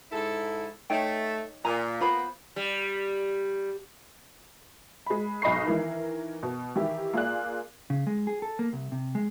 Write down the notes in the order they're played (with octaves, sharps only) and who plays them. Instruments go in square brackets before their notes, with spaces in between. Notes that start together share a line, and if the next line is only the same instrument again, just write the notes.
[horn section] G#2 E4 A4
[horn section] A3 [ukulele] D#4 C#5 G5
[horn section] A#2 [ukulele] G#5 A#5
[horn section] A#3 B3 [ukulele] F4 C5 B5
[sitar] G3
[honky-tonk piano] G#3 B5
B1 G#2 D#5 B5 C#6 C7
D#3 E3 A#4
B2
D#3 E3 E4 G4
A#3 F4 G#4 D5 F#6
[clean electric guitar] C#3
G#3
G#4
A4
A#3
C2
C3
G#3